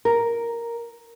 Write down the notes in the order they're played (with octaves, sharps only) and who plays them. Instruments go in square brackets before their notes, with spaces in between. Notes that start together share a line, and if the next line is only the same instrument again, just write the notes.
[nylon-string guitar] A#4